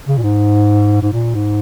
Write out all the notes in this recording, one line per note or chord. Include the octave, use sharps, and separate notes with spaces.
C#3
A#2
G#2
G#2
A#2
G#2